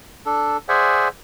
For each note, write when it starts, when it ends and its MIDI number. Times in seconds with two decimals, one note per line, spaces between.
0.26 0.57 62
0.26 0.57 69
0.69 1.08 68
0.69 1.08 72
0.69 1.08 74
0.69 1.08 76
0.69 1.08 78
0.69 1.08 80